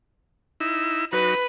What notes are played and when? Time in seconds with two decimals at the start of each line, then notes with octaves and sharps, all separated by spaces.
0.60 D#4 E4 E6
1.13 F#3 D#4 F#4 B4